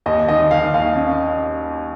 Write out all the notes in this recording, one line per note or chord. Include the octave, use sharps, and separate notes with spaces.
D#2 D#5
D#3 D#5
D#3 F5
D#2 F5
C#4